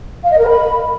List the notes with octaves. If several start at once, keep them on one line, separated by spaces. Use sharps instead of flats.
F5
D#5
A#4
B5